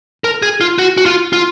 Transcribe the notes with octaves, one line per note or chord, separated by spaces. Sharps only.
A#4
G#4
F4
F#4
F#4
F4
F4